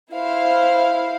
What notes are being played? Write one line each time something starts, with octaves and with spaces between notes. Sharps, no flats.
E4 C5 F5